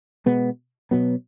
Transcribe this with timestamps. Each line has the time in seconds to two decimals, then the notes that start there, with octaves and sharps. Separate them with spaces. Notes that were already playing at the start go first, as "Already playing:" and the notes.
0.26 B2 G#3 B3
0.91 B2 F#3 B3